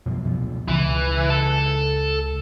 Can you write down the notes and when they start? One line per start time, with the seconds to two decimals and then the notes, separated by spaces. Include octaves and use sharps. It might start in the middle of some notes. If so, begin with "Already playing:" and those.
0.06 F#2 B2 F3
0.25 B2 F3
0.68 C#2 C#3 E3
1.30 A4